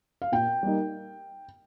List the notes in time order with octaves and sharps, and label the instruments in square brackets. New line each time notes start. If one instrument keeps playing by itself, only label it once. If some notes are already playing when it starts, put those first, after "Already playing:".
[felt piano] F5
[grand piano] A#2 [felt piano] G5
[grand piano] G3 A#3 D#4